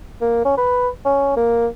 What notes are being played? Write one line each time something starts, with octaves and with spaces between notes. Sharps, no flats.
A#3
C#4
B4
C#4
A#3